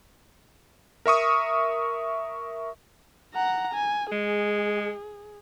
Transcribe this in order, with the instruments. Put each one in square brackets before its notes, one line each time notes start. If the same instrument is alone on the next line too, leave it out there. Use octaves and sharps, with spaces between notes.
[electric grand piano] A#4 E5 C#6 D#6
[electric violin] F#5 A#5
G#5
[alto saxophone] G#3 [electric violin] G#4